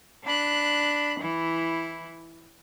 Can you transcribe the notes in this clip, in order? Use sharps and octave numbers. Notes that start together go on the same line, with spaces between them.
D4 B5 F#6
E3 E4